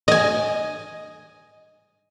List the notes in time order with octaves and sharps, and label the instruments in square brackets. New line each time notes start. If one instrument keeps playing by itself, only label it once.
[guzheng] D#5 G#5